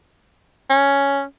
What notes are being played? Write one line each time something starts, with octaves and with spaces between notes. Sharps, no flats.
C#4